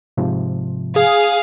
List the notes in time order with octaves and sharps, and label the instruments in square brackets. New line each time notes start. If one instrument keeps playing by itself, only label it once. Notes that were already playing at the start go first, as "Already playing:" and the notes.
[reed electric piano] G#2 C3 F3
[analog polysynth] G#4 [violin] F5